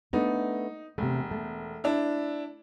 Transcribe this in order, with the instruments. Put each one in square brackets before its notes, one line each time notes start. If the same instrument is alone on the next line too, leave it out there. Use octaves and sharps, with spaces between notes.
[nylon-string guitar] A3 B3 D4 [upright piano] D#4
[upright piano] E1 [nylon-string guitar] C3 A3
[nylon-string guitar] A3
[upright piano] D4 E4